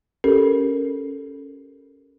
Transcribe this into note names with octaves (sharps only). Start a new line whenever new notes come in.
C#4 G4 A4 A#4